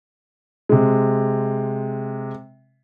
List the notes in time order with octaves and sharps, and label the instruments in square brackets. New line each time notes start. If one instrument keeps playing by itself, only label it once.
[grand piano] C3 G#3